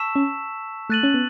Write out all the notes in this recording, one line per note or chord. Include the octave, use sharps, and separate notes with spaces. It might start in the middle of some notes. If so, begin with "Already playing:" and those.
Already playing: A5 C#6 E6 B6 E7
C#4
A3 F#6 A6 D#7 F#7
C#4
B3